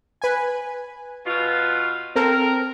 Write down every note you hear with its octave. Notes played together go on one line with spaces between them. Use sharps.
B4 G#5
B2 F4
C4 A4 A#4